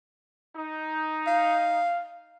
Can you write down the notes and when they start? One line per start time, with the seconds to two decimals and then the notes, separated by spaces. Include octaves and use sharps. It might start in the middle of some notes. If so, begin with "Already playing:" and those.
0.56 D#4
1.27 F5